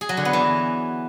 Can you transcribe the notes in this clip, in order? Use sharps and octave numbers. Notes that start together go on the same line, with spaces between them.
G#4
F#3
D3
B3
E3